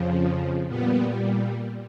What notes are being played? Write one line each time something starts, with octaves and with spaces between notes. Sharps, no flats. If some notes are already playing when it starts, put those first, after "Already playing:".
Already playing: F2 C#3 F3
A#2 G3 B3